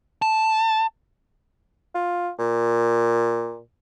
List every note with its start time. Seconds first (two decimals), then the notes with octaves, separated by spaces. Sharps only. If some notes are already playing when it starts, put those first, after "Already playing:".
0.22 A5
1.95 F4
2.39 A#2